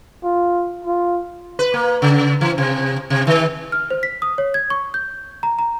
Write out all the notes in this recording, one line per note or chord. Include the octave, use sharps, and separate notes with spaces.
F4
F4
B4
A#3
C#3
E3
C3
C3
D#3
F6
C5
B6
D#6
C#5
G#6
C#6
G6
A#5
A#5